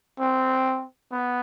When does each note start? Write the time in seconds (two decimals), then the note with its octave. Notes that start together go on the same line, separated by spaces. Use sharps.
0.20 C4
1.12 B3